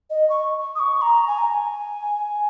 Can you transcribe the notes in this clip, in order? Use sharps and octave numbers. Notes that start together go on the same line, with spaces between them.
D#5
C#6
D#6
C#6
A#5
G#5
A#5
A#5
G#5